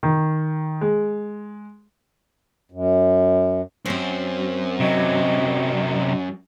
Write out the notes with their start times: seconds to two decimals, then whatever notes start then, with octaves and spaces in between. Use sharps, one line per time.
0.03 D#3
0.81 G#3
2.72 F#2
3.86 F#2 C4 C5
4.81 C3 F#3 D#5